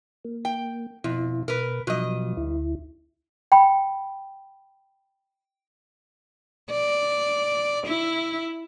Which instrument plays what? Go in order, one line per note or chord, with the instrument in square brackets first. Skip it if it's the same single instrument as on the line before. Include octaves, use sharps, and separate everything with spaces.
[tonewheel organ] A#3
[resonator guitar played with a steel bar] G5
[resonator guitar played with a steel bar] F2 [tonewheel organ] B2 E4
[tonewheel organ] B2 [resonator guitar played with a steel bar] A#4 B4
[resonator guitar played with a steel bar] G2 D#5 [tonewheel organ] B2 F3 F#3
[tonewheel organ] D2 E4
[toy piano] G5 B5
[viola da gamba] D5
E4